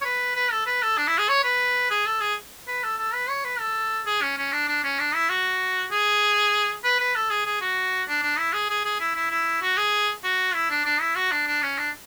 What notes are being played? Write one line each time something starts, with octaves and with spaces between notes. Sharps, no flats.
C#5
B4
B4
A4
B4
A4
D4
E4
G#4
C#5
B4
G#4
A4
G#4
B4
A4
A4
B4
C#5
B4
A4
G#4
C#4
C#4
D4
D4
C#4
D4
E4
F#4
G#4
B4
B4
A4
G#4
G#4
F#4
D4
D4
E4
G#4
G#4
G#4
E4
E4
E4
F#4
G#4
F#4
E4
D4
D4
E4
F#4
D4
D4
C#4
D4